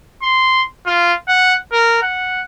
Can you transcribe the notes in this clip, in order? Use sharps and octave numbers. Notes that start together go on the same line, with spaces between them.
C6
F4
F#5
A#4
F#5